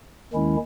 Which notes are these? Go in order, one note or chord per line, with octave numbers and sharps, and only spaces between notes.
D#2 D#3 G#3 C#4 E4